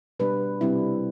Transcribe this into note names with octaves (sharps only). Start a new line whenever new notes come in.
B2 G3 B3 D4 B4
C3 G3 C4 E4